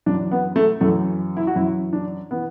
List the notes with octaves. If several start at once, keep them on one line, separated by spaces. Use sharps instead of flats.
F#2 E3 D4
B3
A3
F#2 E3 A3
E4
F#4
F#2 E3 E4
D4
E3 B3